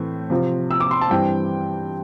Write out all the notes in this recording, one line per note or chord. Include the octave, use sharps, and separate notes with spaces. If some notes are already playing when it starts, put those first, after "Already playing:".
Already playing: A2 E3 A3 C4
C3 F3 C4
E6
D6
C6
A5
G2 E3 G3 C4 G5